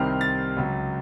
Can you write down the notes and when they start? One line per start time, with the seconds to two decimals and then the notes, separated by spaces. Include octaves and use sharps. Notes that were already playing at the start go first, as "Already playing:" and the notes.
Already playing: C2 C3 D#3 G3 C4 F6
0.21 A6
0.56 C#2 C#3 F#3